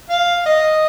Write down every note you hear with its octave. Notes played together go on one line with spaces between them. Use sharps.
F5
D#5